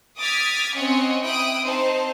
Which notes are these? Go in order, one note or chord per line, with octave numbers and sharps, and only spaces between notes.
D6 D#6 F6 G#6 A6 B6
C4 C#4 C#5 D#5 F#5 G#5
E4 G5 D#6 F#6 D7
C4 D#4 C5 A5